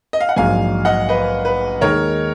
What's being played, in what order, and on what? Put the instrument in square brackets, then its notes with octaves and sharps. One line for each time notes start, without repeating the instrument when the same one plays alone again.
[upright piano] D#5
F5
F#5
[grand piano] A#1 G#2 F#3 [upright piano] F5 G#5
[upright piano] D#5 F#5
B4 D#5
B4
[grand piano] D#2 D#3 G#3 D#4 [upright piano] A#4 C#5